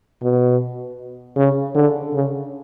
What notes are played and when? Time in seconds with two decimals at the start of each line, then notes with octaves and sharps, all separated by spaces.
0.23 B2
1.37 C#3
1.75 D3
2.13 C#3